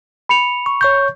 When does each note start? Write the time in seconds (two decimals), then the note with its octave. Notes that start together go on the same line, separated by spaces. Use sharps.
0.29 B5 C#7 F7
0.66 C#6
0.81 C#5 C#6 G6